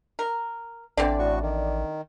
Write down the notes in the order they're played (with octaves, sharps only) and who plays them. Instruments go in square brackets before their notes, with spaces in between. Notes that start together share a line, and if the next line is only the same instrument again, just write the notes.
[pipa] A#4
[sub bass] A1 [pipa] D3 E3 C4 [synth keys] D5
[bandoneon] A2 F#4 C#6
D#3